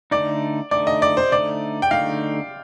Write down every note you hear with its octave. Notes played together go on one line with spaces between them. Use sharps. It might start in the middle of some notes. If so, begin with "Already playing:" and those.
D3 A3 D#4 D5
D3 A3 D#4 D5
D#5
D5
C5
D3 A3 D#4 D5
G5
D3 A3 D#4 F5